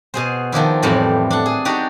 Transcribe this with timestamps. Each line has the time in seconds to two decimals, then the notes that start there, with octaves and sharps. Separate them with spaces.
0.14 B2 G#4 C5
0.52 D#3 F3 D4 E4
0.82 F2 A2 E3 G3 C5
1.31 D4 F#5
1.46 G#4
1.65 D4 D#4 F#4 G4